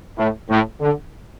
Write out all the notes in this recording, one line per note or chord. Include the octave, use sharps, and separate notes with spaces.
A2
A2
D3